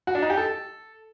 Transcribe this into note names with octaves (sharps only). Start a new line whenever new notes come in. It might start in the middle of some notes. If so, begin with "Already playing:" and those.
F#4
D4
D#4
G4
A4